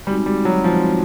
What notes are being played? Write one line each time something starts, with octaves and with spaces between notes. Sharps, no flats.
G3 G#3 C4 D#4 F#4
G3
F#3
F3 G#3 C4 D#4 F#4